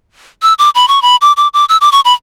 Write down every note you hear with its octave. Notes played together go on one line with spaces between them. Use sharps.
E6
D6
B5
C#6
B5
D6
D6
D6
E6
D6
C#6
B5